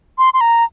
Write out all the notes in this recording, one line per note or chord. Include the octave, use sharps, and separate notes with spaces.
C6
C6
A#5